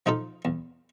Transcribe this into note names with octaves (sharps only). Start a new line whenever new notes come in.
F3 D#4 F4 A4
E2